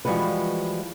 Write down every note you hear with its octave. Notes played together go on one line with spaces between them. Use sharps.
E3 F3 G3 G#3 F#4 B4